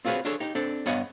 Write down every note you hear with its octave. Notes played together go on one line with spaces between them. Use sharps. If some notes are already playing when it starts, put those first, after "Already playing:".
C4 F4 F#4 G#4 B4 C#5
D4 G#4 A4 C#5
D#4 G4
C4 D4 A4
G2 B3 C#5 D#5 F#5